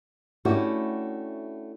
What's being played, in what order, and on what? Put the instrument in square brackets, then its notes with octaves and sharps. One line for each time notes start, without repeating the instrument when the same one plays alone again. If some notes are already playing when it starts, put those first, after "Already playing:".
[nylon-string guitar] A3 C#4 D4 E4 F#4 G4